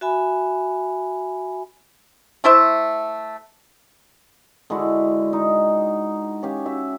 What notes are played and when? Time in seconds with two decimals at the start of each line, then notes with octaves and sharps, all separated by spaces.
0.01 F#4 E5 G#5 B5
2.44 A3 E4 C5 E5
4.70 D3 G#3 E4 F#4
5.33 D#4
6.43 C#4 G4 F5
6.66 F#4 E5